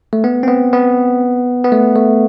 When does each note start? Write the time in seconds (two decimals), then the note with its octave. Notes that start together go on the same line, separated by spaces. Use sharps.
0.13 A3
0.24 B3
0.43 C4
0.48 B3
0.73 B3
1.65 B3
1.72 A3
1.96 A3